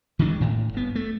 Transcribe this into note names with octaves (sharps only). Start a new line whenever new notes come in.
D#3 E3 G#3 D4
A2
G1 B3
A3